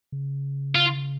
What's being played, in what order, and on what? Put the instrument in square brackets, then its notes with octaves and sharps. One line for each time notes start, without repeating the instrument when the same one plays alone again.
[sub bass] C#3
[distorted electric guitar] F4